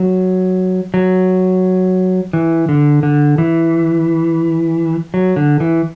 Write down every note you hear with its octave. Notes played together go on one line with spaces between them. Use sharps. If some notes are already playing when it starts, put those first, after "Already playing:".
Already playing: F#3
F#3
E3
D3
D3
E3
F#3
D3
E3